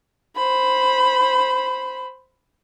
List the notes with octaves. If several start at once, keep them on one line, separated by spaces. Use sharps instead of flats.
C5 B5